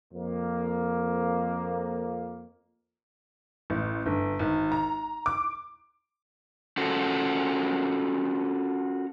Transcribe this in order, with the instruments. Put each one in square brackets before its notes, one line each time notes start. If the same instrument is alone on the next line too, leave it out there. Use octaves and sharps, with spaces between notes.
[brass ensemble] F2 A#3
[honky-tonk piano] A1
G1
G#1
A#5
D6
[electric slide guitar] C#4 F4 F#4 A4 C5